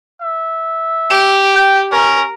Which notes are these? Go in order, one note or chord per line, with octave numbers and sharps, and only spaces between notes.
E5
G4
G5
C#4 A#4